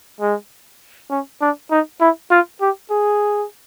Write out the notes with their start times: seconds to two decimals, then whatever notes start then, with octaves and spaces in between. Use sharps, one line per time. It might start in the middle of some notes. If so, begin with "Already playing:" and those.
0.21 G#3
1.10 C#4
1.41 D4
1.71 D#4
2.01 E4
2.31 F4
2.61 G4
2.91 G#4